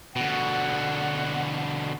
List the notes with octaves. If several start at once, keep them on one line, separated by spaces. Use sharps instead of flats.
B2 D3 F#5